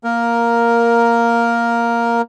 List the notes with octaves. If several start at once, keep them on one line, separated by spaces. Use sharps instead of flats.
A#3 A#4